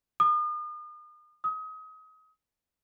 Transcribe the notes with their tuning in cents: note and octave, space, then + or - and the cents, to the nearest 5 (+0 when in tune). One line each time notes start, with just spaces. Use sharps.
D#6 -40
D#6 +30